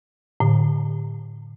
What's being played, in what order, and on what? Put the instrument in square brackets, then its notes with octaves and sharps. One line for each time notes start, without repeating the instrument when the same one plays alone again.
[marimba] A2 D3